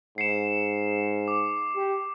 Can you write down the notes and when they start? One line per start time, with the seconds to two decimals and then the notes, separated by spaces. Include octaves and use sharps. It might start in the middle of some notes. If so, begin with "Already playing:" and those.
0.18 G#2 C7 C#7 E7
1.28 D6
1.76 G4